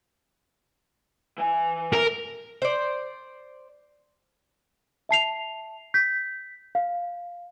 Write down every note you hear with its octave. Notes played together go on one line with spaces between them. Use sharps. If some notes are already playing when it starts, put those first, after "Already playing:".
E3 G#5
A#4
C5 D5
E5 A5 C7 F7
G6 B6
F5